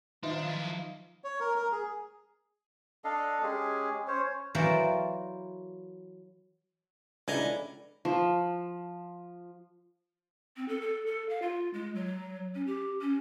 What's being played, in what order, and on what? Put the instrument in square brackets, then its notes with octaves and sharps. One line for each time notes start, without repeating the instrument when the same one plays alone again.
[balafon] D#3 E5 [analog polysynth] F3 F4 F5 [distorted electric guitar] D4 [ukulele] D#4
[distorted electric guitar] F#3 E4
[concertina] C#5
A#4
A#4
G#4
[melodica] D4 A4 D#5 F5
G#3 C#4 G4 G#4
C#4 C5 C#5
[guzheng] E3 F#3 F4 A#4 C5 D5
[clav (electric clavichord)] C#2 G#5 A#5 [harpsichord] D4 E4 A4
[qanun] F3
[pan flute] C4
A4
A4
A4
F5
F4
G#3
F#3
C#4
G4
C#4